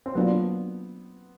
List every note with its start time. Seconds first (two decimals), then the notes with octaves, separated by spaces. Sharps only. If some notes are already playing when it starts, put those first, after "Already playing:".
0.06 C4
0.15 F#3 A#3 B3 D4 F4